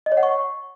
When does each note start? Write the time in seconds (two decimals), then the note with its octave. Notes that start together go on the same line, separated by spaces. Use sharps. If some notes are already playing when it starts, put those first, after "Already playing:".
0.06 D#5
0.12 C#5
0.17 F#5
0.23 C#6